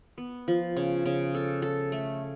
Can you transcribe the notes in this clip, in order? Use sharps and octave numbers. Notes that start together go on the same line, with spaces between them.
B3
F3
C#3
C#3
A4
A4
A3